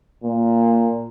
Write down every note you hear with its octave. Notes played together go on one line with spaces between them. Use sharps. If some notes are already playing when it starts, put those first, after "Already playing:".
A#2